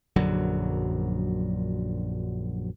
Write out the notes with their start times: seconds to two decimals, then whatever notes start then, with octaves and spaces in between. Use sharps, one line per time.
0.16 A#1 F#2 D3 F#3